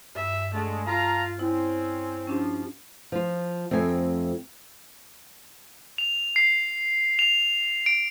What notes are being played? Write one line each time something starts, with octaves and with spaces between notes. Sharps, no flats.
G2 E5
D3 G#3 A3
F4 F5 A5 A#5
C4 C#4 E4
F3 C#4 D4 G4
F3 F4
F2 A3 C4 G#5
F7
C7
F7
D7